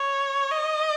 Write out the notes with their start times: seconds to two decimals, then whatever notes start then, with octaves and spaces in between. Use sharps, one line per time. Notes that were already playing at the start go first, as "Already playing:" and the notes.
Already playing: C#5
0.51 D#5